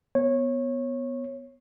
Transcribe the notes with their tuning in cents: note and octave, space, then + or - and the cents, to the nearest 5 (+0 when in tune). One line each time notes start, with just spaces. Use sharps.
B3 +0 C#5 -20